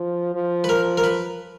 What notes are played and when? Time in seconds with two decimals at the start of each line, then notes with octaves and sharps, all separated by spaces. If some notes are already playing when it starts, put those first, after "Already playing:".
Already playing: F3
0.35 F3
0.64 B4
0.69 A#4
0.97 A#4
1.04 B4